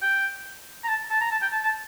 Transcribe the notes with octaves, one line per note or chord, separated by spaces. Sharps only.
G5
A#5
A5
A5
A#5
A5
G5
A5
A5